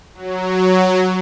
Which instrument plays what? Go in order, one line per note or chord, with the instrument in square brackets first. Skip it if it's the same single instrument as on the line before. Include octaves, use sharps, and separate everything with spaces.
[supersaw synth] F#3